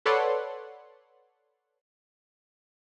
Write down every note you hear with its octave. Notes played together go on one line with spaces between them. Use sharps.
A4 B4 C#5 D5 F#5 C6